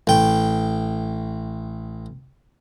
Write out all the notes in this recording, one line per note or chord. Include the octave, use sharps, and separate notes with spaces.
A1 G5